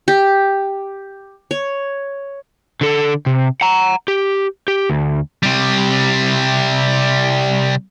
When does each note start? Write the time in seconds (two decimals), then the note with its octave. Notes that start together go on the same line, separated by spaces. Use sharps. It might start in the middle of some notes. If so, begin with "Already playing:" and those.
0.08 G4
1.51 C#5
2.81 D3 A4
3.26 C3
3.61 F#5 A#5
4.08 G4
4.68 G4
4.90 D2
5.43 C3 G3